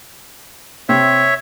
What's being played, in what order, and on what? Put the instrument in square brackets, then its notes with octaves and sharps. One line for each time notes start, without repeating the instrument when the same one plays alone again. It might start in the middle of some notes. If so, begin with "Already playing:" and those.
[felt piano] C3 C4 [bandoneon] C#5 E5